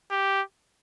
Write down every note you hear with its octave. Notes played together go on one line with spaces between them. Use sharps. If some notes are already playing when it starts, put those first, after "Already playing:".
G4